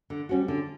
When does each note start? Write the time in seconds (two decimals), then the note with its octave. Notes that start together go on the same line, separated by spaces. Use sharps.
0.10 D3
0.29 G3 C#4 F#4
0.48 D3